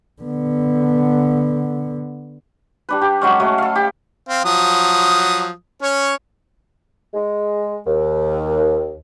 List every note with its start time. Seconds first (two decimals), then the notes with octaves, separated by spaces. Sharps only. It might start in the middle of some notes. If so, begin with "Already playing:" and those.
0.22 D3 B3
2.89 G3 D4 B4
3.01 G4
3.22 F#3 G#3 C#4
3.40 F#3 A3 D#5
3.58 A4 F5
3.76 G4 G5
4.29 C4 F5
4.44 F3 F#3 D#6
5.82 C#4 C#5
7.14 G#3
7.86 D#2